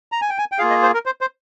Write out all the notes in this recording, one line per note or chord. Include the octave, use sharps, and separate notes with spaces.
A#5
G#5
G5
G#5
G5
A#3 F4 G#4 F5
D#5
C5
A#4
C5
C5